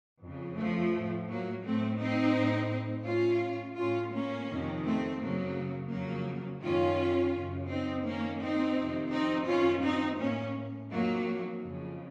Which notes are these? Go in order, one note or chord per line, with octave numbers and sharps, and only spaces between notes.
F2 C#3
F3 A3
A2
F#3 A#3
A2 A3 C4
C4 D#4
A2
A2 C#4 F4
A2 C#4 F4
A#3 C#4
F2 C3 D#3
A3 C4
F#2 C#3 F#3 A#3
F2 C#3 F#3 A#3
F#2 D#3 C#4 F4
F#2 C#3
C4 D#4
F#2 D#3 A#3 C#4
C4 D#4
F2 C3 D#3
C4 D#4
F#2 D#3 C#4 F4
C4 D#4
A2 A#3 C#4
F2 D#3 F#3 A#3
F2 C#3